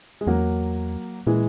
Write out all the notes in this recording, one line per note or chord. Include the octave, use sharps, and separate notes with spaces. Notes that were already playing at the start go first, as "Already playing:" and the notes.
G#3
E2 F#3 A#3
A#2 E3 G#3